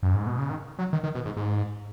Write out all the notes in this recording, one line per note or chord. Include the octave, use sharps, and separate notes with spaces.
F#2
G#2
B2
C#3
D#3
F#3
D#3
D#3
B2
G#2
G#2